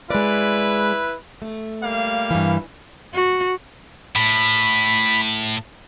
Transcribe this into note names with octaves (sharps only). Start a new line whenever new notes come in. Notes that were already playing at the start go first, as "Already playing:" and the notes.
G#3 E4 B4 D5
A3
G3 A#3 F5
G2 E3
F#4
A2 B5